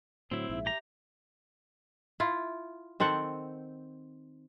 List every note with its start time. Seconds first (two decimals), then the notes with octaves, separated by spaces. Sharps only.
0.31 A2 D3 F#3 C4 E4
0.50 A#1 G#2 E5
0.66 G4 A#5
2.20 E4 F4
3.00 D#3 C4 A4 F#5